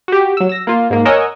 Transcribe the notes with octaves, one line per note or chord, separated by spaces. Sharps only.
F#4 G4
F#3 E6
E6 A#6
A#3 F4
G#2 A#3
A#4 C#5 D#5 F#5 G#5 E6